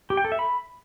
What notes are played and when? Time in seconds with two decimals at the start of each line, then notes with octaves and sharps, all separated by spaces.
0.10 G4
0.17 G5
0.25 A4
0.32 E5
0.39 B5